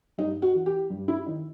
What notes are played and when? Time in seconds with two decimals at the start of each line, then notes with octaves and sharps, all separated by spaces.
0.18 G2 D#4
0.42 F#4
0.55 E3
0.66 G4
0.90 G2
1.08 E4
1.26 D#3 D#4